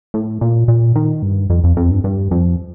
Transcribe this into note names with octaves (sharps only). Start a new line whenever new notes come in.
A2
A#2
A#2
D#3
G2
F2
F2
F2
G2
G2
F2